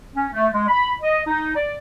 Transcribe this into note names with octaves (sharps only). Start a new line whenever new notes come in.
C#4
A3
G#3
B5
D#5
D#4
D5